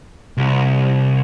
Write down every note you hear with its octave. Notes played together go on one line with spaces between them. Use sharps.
C2